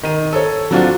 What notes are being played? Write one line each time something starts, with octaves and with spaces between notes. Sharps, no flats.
D#3 D#7
A4 C#5
F#3 C4 D4 F4 F#4